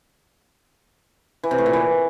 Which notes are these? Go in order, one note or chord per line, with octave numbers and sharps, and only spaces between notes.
E3
C3
A2
A#2
E3